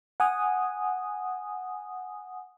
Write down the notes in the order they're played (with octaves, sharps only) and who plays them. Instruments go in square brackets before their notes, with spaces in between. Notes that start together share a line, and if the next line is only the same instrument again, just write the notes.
[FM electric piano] F#5 G#5 D#6